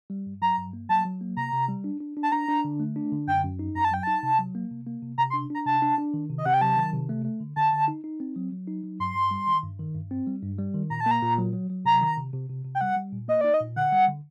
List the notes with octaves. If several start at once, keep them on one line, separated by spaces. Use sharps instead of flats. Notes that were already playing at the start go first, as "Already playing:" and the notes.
G3
G2
F#3 A#5
G2
A#3
F#3 A5
F#3
A#3
C3 A#5
C3
G3
D4
D4
D4
A5
D4 A#5
D4
D3
A3
D4
D3
F#2 G5
F#2
D#4
F#2 A#5
A5
F#3 G5
D#4 A5
C3
F#3
A#3
C3
A#3
C3
C3 A#5
C6
D4
D4 A#5
C3 A5
D4
D4
D#3
C3
D#5
C3 F#5
G5
F#3 A5
D#3
C3
A3
A3
D3
D3 A5
D3
D#4
D#4
C4
F#3
F#3
D#4
F#3
G2 C6
G2
G3
D#3
G2
D#3
G2
C4
G3
G2
G3
D#3
A#2 A#5
A5
A#3
A#5
A#2
F#3
F#3
F#3
C3 A#5
D#3
C3
C3
C3
C3
G5
G3 F#5
G3
A#2
A#3 D#5
D#4 D5
D#5
A#2
D3 F#5
G3
D3